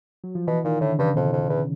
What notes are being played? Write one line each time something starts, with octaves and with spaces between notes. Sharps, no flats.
F#3
F3
B2 E3
A#2 D#3
A2 D3
G2 C#3
F2 B2
F2
E2